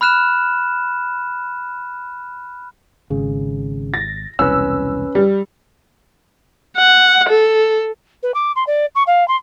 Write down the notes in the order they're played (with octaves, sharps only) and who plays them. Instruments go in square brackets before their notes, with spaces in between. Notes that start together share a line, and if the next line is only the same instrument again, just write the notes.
[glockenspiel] B5 F6 F#6 E7
[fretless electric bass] G#1 [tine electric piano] C#3
[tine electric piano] A6 [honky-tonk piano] A#6
[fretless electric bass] E1 C2 [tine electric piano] C#4 B4 [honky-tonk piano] E6
[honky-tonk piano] G3
[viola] F#5
A4
[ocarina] B4
D6
C6
D5
C#6
F5
C6